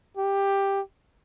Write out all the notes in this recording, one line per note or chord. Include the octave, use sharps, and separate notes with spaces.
G4